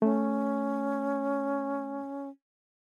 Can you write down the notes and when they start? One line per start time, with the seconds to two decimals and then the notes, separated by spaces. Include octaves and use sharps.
0.02 A3 C#4